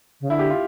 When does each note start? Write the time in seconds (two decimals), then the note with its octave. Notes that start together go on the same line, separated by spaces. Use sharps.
0.21 C#3
0.29 D3 E4
0.39 G4
0.50 F4